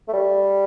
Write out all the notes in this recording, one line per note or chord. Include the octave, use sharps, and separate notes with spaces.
A3
G3